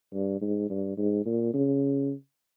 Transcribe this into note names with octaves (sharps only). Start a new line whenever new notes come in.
G2
G#2
G2
G#2
A#2
C#3